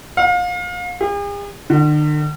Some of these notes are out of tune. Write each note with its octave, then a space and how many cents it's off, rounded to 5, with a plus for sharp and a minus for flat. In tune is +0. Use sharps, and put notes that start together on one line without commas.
F5 +35
G#4 -45
D3 +45